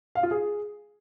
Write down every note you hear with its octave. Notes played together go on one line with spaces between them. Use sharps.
F5
F4
G#4